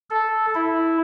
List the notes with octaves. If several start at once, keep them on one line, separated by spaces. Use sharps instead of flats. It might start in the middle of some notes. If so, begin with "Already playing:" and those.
A4
E4